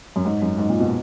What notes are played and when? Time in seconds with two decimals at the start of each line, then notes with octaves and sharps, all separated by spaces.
0.16 F#2
0.25 G#2
0.42 F#2
0.58 G#2
0.69 A#2
0.80 B2